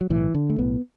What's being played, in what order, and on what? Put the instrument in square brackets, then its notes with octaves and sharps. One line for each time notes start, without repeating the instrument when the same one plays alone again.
[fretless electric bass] F#3
B1 A2 E3
D3
A3
B1 A2 B3